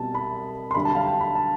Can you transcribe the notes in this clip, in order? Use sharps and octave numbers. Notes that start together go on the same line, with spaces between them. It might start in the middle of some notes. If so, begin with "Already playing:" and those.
Already playing: C2 B2 G3 A5
B5
C6
D2 D3 G3 B5
A5
F5
A5
G5
B5
A5